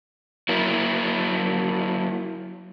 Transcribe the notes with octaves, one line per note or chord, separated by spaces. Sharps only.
F#3 A#3 E4 A#4